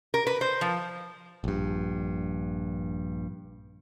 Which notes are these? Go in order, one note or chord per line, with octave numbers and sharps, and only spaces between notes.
A#4
B4
C5
F3
A#1 G2